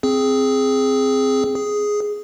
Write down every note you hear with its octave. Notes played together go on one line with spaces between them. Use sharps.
C4 G#4
G#4